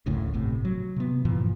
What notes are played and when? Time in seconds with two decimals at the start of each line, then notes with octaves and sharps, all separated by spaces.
0.06 F#1 D2 A2 C#3
0.34 G1 A2 C3
0.65 F#3
0.96 C3 B3
1.25 G2 A#2 E3 F3